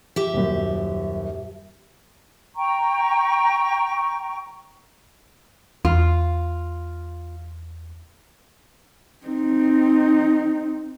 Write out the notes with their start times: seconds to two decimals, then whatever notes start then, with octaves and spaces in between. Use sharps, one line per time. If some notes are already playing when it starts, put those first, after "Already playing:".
0.16 G4 E5
0.34 D#1 F#2
2.56 G5 A#5 C#6
5.85 E2 F4
9.27 C4 D#4